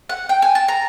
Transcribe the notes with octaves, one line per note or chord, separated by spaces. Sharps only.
F#5
G5
G#5
A5
A#5